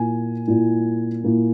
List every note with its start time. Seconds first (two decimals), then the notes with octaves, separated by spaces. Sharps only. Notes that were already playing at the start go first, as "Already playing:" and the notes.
Already playing: A#2 A#3 E4 G#5
0.47 A#2 A#3 E4
1.24 A#2 A#3 E4